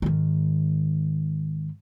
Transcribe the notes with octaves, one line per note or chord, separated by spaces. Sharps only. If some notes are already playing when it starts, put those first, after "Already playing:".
G#2 D#3